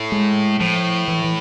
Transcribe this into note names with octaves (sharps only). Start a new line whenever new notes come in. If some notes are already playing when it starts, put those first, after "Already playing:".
Already playing: A2
G#3
A2 F3
E3
E3